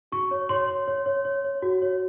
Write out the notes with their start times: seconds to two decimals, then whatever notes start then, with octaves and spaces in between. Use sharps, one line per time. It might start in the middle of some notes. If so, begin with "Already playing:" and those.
0.12 F#4 C#6
0.31 C#5
0.49 C#5 C6
0.68 C#5
0.88 C#5
1.06 C#5
1.25 C#5
1.45 C#5
1.62 F#4
1.82 C#5